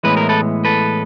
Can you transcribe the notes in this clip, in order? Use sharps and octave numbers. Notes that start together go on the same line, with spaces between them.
A2 E3 G#3 B3 B4
A#4
A4 B4
A4 B4